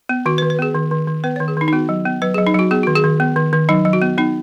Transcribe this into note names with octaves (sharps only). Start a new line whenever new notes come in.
B3
D#3 F#4
B4
D#3
B4
B3 G#4
D#3
D#3
D#3
B3 B4
C#5
D#3
G#4
D#3 D#4
D#4
B3 F#4
F#3
B3
F#3 B4
G#4
F#3
D#4
F#3 F#4
B3 G#4
D#3 F#4
G#4
D#3
B3
D#3
D#3
F#3 D#4
F#3
F#4
B3
B3 D#4